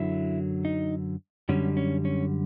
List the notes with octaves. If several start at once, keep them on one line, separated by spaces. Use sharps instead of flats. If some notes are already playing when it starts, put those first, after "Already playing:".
Already playing: F#2 D3 F#3 E4
D#4
F#2 D3 G3 C#4
C#4
C#4